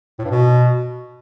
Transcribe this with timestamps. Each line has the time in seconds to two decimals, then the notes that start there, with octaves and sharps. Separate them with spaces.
0.19 A2
0.25 G2
0.30 B2